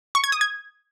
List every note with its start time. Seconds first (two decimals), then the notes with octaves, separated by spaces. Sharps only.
0.15 C#6
0.24 G#6
0.32 D#6
0.41 G#6